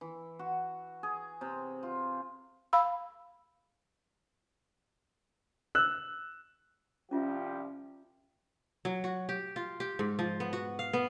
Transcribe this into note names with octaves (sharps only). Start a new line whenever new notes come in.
E3
F#4
G#4
C3
F4
F5 B5 E6
E6 F#6
C2 F3 C#4 F4 G4 E5
F#3
F#4
G4
F4
G4
G#2
F3
B3
F#4
F5
B3